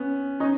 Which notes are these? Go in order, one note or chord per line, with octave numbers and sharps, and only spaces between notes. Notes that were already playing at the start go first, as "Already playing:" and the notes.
Already playing: B3 C#4
C#4 D#4